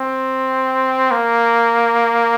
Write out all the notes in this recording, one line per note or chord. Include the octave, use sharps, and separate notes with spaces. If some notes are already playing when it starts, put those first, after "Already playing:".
Already playing: C4
A#3